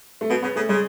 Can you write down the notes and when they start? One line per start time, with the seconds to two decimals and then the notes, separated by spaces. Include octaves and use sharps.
0.21 A3
0.30 B2 B3
0.42 C#3 B3
0.56 C#3 A3
0.69 C#3 G#3